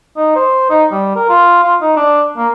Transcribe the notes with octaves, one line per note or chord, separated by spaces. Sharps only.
D#4
C5
D#4
G3
A#4
F4
F4
D#4
D4
A#3